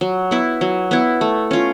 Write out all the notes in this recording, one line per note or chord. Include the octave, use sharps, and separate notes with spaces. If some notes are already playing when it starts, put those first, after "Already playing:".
F#3
B3 E4
F#3
B3 E4
A3
C#4 F4